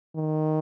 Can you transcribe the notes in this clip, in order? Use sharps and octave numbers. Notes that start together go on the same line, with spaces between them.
D#3